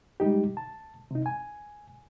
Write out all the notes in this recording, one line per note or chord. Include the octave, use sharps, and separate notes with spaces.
G3 G#3 D#4 G4
A5
C3 D#4
G#5